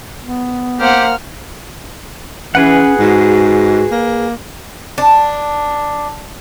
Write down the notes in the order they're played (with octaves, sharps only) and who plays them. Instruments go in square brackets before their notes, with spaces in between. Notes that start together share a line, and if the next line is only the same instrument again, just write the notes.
[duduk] B3
[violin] A#3 F6 [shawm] G4 [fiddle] C5 F#5
[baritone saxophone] E3 [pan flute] C#4 [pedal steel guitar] G#4 B4 F#5
[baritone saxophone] G#2 [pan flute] F#4
[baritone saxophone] A#3
[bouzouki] D4